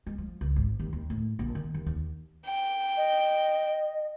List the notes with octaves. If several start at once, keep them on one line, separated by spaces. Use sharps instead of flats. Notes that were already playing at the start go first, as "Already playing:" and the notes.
G#3
F3
C#2
G#1
D#2
D#2
A2
A#1
D#3
D#2
D#2
G5
D#5